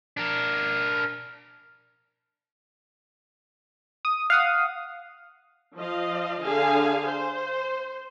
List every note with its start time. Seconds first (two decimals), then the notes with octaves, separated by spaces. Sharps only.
0.17 D4 A#4
4.05 D#6
4.30 F5 F#5 D#6
5.76 F3 D#5 F5
6.45 D3 G#4 F5 G#5
7.09 C5